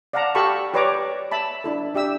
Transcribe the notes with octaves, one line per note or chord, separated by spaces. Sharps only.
D5 F5 F#5 A5 A#5
G4 A4 F5 A5 B5 C#6
G4 B4 C#5 D5 A#5 D6
E5 A5 B5
D4 E4 A4
D4 G4 E5 E6